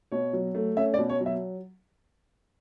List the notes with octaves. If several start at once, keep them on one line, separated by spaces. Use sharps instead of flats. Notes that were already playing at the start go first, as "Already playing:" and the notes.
B2 C#5
F#3
A3
C#4 E5
D5
B2
C#5
F#3
E5